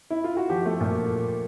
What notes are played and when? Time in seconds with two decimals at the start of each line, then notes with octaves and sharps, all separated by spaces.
0.10 E4
0.24 F4
0.37 F#4
0.49 F3 G4
0.66 A3
0.81 A#2